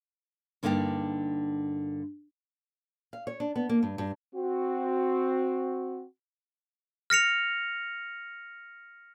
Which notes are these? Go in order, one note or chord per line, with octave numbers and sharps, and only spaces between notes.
G2 D3 A#3 D#4 F4 G4
F5
C#5
D4
B3
A#3
G2
G2
C4 F#4
F6 A#6 C#7 F7